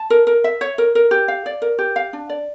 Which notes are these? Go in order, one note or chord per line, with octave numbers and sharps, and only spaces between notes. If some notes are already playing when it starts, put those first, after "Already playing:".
Already playing: A5
A#4
A#4
E5
C#5
A#4
A#4
G4
F5
D5
A#4
G4
F5
D4
D5